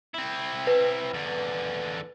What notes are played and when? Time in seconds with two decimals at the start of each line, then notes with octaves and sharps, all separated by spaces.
0.14 C4 E4
0.67 B4
1.13 E2 D3